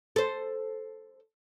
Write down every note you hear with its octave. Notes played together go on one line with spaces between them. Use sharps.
A4 C5